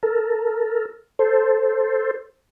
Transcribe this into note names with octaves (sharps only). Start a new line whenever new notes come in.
A4 A#4
A4 C5